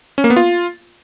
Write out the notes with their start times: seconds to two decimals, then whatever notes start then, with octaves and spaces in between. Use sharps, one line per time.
0.18 C#4
0.24 A#3
0.30 B3
0.36 F4